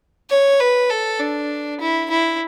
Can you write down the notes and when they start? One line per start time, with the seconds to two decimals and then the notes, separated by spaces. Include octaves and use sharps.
0.30 C#5
0.60 B4
0.90 A4
1.20 D4
1.81 E4
2.10 E4